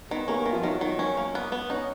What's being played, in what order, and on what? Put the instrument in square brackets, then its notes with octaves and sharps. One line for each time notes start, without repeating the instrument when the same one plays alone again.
[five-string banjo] D#3 [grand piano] B3 B4
[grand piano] A#3 A#4 [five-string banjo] C#4
[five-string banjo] D#3
[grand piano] F3 F4
[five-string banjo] D#3 [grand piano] F#3 F#4
[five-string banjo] D#3
C#4
A#3
B3
B3
[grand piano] C#4 [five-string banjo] D#4